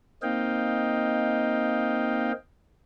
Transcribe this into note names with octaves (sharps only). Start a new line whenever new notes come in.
A#3 C4 D#4 D#5 F5 G5